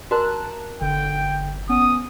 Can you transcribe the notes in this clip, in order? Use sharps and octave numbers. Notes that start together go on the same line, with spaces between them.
F#4 A#4 A5 A#5 F#6
G1 D3 G5
B3 C#4 D#6